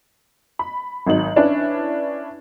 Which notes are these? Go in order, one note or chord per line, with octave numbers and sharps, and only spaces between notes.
B5
G#1 F#3 D#4 F#7
C#4 D4 E4 B4